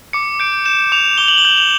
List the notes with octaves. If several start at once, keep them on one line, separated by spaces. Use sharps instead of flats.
D6 C#7
G6 D7
G6 E7
D6 F7
D6 G7
F#7
G7
G6
F7